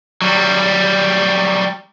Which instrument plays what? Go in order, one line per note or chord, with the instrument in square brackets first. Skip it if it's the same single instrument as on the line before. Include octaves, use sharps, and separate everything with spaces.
[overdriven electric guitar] F#3 G3